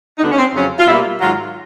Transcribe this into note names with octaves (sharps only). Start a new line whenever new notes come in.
D#4
D2 D3 G3 B3 D4
C#4
C4
F2 C#3 F#3 C#4
F4
B2 G3 A#3 E4
G#2 D#3 F#3 F4